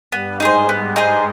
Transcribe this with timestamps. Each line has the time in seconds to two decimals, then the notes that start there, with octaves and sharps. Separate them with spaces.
0.12 G2 G3 B3
0.40 G#2 G#3 D#4 G#4 C5
0.68 G#2 G#3 B3
0.96 G2 G3 D#4 G#4 C5